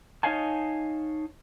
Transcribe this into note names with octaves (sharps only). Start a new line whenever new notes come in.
D#4 C#5 D#5 F5 G#5 A5